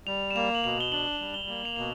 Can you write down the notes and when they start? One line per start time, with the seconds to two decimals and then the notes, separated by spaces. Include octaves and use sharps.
0.07 G3 F7
0.31 E7
0.35 A#3 F7
0.55 F#7
0.64 B2 F7
0.81 G7
0.92 D4 F#7
1.20 G3
1.34 G7
1.48 A#3
1.65 F7
1.76 B2 F#7